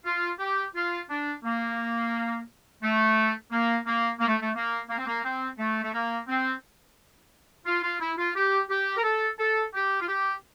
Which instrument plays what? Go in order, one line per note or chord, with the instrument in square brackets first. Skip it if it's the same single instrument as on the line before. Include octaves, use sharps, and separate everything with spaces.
[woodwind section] F4
G4
F4
D4
A#3
A3
A#3
A#3
A#3
A3
A3
A#3
A#3
C4
A#3
C4
A3
A3
A#3
C4
F4
F4
E4
F4
G4
G4
A#4
A4
A4
G4
F4
G4